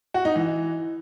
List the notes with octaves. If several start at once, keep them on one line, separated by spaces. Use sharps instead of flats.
F#4
D#4
E3